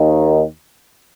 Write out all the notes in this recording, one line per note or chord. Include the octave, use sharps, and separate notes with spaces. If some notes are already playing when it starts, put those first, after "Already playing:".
Already playing: D#2 D#3